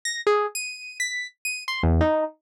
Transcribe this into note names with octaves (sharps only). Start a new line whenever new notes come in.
A#6
G#4
D#7
B6
D#7
C6
E2
D#4